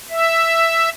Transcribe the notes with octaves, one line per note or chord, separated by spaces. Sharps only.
E5